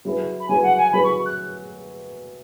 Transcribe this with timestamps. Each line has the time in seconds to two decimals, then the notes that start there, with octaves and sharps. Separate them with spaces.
0.05 F#3 E4 G#4 B4
0.40 B5
0.48 F#3 E4 G#4 B4 G#5
0.63 F#5
0.78 G#5
0.93 F#3 E4 G#4 B4 B5
1.04 C#6
1.26 F#6